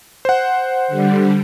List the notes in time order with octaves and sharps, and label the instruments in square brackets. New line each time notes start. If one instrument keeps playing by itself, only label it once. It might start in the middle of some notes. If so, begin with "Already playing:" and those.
[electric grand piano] C5 F#5
[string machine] D3 G3